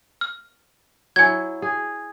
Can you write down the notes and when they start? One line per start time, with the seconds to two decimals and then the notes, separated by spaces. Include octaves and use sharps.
0.21 F6
1.16 F#3 E4 G#5 G#6
1.62 G#4